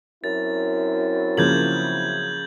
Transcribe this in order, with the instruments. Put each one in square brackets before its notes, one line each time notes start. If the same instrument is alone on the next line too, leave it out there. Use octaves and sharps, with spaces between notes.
[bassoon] F#2 [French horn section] F#3 C4 E4 [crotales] A6
[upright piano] C#3 F3 A#3 [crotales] G6 G#6 F#7